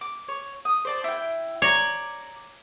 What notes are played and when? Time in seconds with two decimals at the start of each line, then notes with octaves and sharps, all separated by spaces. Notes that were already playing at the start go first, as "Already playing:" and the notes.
0.01 D6
0.28 C#5
0.65 D#6
0.85 C5 D5 A5
1.04 E4 G5
1.62 C#5 D5 A#5